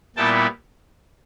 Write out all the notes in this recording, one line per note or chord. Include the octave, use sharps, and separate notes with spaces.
A#2 G3 B3 E4 G5 A5